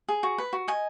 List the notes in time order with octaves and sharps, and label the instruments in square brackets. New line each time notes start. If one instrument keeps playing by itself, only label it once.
[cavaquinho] G#4
F#4
B4
F#4
D#5 G#5